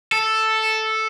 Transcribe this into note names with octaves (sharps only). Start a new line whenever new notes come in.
A4